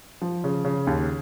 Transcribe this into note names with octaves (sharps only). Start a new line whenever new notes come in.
F3
C#3
C#3
D#2